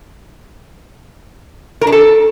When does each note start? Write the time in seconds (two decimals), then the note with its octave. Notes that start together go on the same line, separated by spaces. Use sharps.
1.81 A#4
1.87 D4
1.92 A4